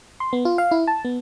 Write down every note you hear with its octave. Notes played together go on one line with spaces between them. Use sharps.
C6
B3
F4
F5
E4
A5
B3